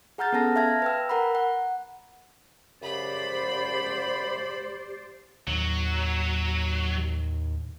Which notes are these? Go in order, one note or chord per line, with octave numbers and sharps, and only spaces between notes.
G#4 F#5 A#5 F6 G6 A6
B3 C#4 A4 A5 A#6
E5 F5 A5 F6 G#6 A#6
B4 G5 E6
A#4 F#5 A#5 B5
F#5
F#2 C#3 G4 C5 D5 B5
D#2 A2 F#3